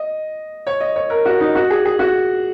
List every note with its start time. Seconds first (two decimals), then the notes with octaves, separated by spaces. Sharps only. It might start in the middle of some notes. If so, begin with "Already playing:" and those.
Already playing: D#5
0.67 C#5
0.80 D#5
0.96 C#5
1.10 A#4
1.25 F#4
1.40 D#4
1.55 F#4
1.70 G#4
1.85 G#4
1.99 F#4